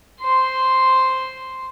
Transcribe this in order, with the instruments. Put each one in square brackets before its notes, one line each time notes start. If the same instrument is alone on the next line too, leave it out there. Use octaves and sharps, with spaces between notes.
[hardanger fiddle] C5 C6